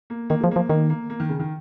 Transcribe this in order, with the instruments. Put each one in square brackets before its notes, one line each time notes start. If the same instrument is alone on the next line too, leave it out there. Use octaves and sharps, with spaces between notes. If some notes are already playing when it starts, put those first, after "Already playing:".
[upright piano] A#3
[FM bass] D#3 [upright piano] A#3
[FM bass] F3 [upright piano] G#3
[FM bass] F3 [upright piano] A#3
[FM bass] D#3 [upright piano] A#3
[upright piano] A#3
A#3
D#3
C#3
D#3